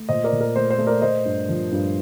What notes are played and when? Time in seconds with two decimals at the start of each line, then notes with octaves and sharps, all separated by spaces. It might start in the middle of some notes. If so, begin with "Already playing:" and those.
Already playing: A3
0.09 A#2 C5 D#5
0.24 A#4 D5
0.32 A#2
0.40 A#4
0.56 A3 C5
0.70 C5
0.78 A3
0.87 A#4 D5
1.02 A3 C5 D#5
1.25 G2
1.49 F3
1.72 G2